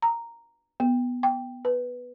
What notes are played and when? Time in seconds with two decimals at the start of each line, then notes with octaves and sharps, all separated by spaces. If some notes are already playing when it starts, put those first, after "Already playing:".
0.02 A#5
0.80 B3
1.23 G5
1.65 B4